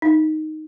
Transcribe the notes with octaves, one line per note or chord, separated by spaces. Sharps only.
D#4